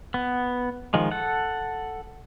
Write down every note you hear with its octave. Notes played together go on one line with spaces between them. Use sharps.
B3
D#3 F3 G#3
A4 F#5